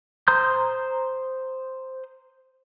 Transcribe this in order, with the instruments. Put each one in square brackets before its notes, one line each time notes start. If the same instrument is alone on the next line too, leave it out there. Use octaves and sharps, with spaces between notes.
[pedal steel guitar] C5 A#5 C6 D#6 G6